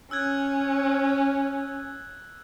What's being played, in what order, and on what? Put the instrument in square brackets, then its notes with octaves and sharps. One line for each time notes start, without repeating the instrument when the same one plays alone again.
[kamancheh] C#4 [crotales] E6 F#6 G#6